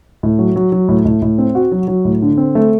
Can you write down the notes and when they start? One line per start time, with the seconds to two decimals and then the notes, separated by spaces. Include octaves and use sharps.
0.23 A2
0.39 F#3
0.56 F#3
0.72 F#3
0.89 A2
1.05 A2
1.22 A2
1.38 C4
1.55 F#4
1.72 F#3
1.88 F#3
2.05 A2
2.22 D3
2.37 C4
2.55 A3